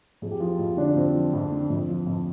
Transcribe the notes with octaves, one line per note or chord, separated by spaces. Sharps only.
F2 G#4
G4
F3 F4
F2 F4
D3 D4
F2 C4
F3
F2
D3
F2
F3
F2